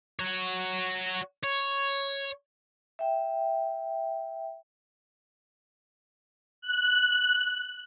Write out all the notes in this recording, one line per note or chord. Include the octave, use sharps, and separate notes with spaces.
F#4 C#5
C#5
E5 G5
F#6